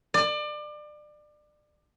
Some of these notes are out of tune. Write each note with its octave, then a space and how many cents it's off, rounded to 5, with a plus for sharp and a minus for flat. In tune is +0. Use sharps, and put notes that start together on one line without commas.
D5 +30